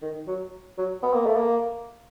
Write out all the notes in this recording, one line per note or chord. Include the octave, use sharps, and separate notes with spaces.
D#3
F#3
F#3
B3
A#3
A3
A#3